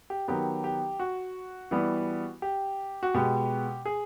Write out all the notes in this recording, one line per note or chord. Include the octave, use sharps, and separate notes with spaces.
G4
D#3 F#3 B3 G4
G4
F#4
E3 G3 B3
G4
F#4
B2 G#3 B3 G4
G#4